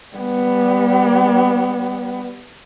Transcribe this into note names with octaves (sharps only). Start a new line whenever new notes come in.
G3 B3